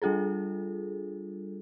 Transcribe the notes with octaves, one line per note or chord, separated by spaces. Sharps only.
G3 D4 F4 G#4 A4